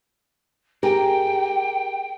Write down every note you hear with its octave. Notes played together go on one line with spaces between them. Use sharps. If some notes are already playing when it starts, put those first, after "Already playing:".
G4 G#4 A#4 G5